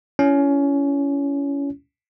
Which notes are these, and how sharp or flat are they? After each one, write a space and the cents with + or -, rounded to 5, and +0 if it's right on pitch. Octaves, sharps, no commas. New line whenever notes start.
C#4 +20 E4 +35